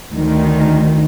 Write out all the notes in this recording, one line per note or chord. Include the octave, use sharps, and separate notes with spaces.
D2 D#3